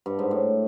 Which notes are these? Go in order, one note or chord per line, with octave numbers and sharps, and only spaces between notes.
G2
G#2
A2